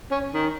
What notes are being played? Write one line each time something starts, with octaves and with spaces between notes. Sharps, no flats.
C#4
D#3